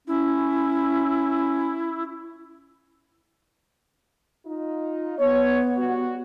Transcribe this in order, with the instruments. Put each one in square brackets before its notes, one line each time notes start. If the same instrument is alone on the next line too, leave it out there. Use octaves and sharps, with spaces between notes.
[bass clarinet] C#4 [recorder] E4
[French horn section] D#4 F4
[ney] B3 [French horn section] C#5
[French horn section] G3 F#4